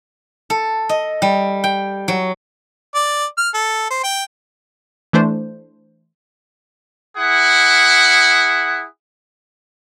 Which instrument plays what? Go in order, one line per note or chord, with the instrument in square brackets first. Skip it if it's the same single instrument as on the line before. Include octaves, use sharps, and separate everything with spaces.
[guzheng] A4
D#5
G3
G5
F#3
[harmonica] D5
F6
A4
C5
G5
[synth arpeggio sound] E3 A3 D4 C5
[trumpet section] E4 G#4 F#5